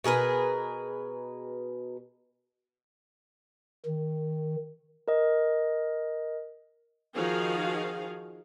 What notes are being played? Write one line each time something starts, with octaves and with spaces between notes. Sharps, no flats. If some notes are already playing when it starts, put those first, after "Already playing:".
B2 G#4 A#4 B4
D#3
A#4 D#5
D#3 F3 D#4 F#4 G#4 F5